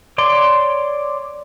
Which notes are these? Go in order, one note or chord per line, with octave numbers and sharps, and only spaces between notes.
C#5 D5 C6